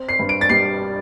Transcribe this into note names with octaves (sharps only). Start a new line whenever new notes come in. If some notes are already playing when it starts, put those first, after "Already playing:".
Already playing: C4
C7
G2
D7
A6
G3 C7